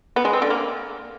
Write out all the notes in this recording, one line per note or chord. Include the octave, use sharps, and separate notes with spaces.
B3
G#3
C4
D3
A#3